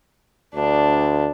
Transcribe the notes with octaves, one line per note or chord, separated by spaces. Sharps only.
D2 D4